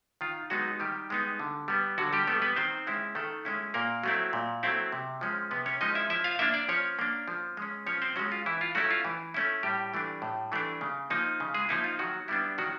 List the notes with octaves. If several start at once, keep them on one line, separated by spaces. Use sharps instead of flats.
D#3 F4
F#3 G#3 B3 D#4 F#4
D#3 G3 G4
G#3 B3 D#4
D3
G3 B3
D3 F#3 F#4
G3 G4
G3 A3 B3 A4
B3 B4
D#3 C4 C5
G#3 C#4 E4
D#3 A3 A4
G#3 C#4 E4
A#2 A#3 A#4
F#3 A3 C4 E4
A#2
F#3 A3 C4 E4
C3
F3 G#3 C#4
C3 B3 B4
C#4 C#5
F3 G#3 C#4 D#4 D#5
E4 E5
F3 E4 E5
F4 F5
A#3 D4 E4 E5
D4 D5
F3 C#4 C#5
A#3 D4
F3
G#3 C#4
F3 C#4 C#5
C4 C5
F#3 G#3 C#4 F#4
F4
E3 E4
F4
F#3 A3 C#4 E4 F#4
F4
E3
A3 C#4 E4
A2 G3 G4
E3 A3 D4
A2
E3 A3 D4
C#3
F3 A#3 D#4
C#3
G#3 G#4
F3 A#3 D#4 E4
F4
D#3 F#3 F#4
G3 B3 D4 E4
D#3 F#3 F#4